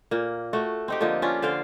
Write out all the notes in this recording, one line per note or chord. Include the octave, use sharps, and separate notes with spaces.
A#2 A#3
A3 F#4
C4 D#4 G4
D3 F3 A#3 D#4
C#4 D4 F4
D3 C5 F5 G5